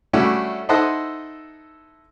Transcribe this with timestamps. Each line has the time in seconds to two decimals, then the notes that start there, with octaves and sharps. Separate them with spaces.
0.13 G3 A3 C#4 D4 E4 F#4
0.69 D#4 E4 A4 C5 D#5 F#5